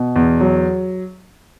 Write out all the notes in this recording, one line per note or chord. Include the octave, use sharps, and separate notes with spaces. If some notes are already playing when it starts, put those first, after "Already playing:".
Already playing: B2
E2
F#3